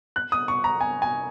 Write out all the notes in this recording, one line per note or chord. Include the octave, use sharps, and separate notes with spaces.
F#6
D#6
C#6
A#5
G#5
G#5